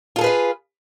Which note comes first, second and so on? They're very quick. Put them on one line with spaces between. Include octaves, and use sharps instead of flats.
F4 A4 G#4 B4 F5